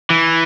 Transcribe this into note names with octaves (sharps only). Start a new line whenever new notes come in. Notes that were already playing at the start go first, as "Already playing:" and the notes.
E3